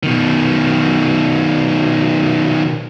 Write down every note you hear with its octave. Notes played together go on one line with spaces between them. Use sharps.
B2 D#3